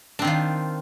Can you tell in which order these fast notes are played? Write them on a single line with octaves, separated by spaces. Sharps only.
D4 C4 D#3 F4